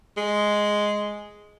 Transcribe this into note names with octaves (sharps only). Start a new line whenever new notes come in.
G#3